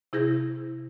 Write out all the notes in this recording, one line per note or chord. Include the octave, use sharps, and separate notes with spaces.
C3 E4 G#4 G6 A#6